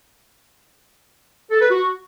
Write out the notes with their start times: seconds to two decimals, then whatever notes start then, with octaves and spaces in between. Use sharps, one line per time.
1.51 A4
1.61 B4
1.71 F#4